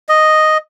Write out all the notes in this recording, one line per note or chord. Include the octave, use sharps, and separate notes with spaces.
D#5